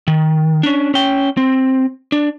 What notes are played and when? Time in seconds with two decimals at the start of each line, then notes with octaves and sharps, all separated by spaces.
0.08 D#3
0.63 C#4 D4
0.94 C#4 G5
1.37 C4
2.12 D4